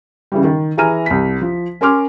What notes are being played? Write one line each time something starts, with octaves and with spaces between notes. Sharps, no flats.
C#3 E3 G3
D#3
E3 G#4 G#5 A#5 F6 D#7
C2 B6
F3
C#4 A#4 G#5 C6 D6 F6